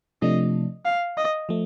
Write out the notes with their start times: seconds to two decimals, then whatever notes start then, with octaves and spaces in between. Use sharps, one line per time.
0.22 C3 F3 A3 D4 D#5
0.85 F5
1.17 D#5
1.49 F3 A3